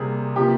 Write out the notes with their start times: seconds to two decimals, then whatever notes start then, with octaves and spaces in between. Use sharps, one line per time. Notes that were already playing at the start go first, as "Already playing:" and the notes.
Already playing: C3 G3 A#3 G#4
0.36 C3 F3 A#3 G4